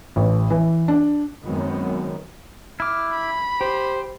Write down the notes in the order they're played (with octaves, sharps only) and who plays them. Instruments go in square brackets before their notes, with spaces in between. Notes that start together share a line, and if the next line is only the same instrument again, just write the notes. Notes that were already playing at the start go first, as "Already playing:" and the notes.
[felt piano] A1
E3
D4
[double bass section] F#2 D#3 F#3 G#3 B3 C4
[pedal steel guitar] E4 D6 [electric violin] F6
[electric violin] B5
[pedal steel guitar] G4 [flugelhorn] C5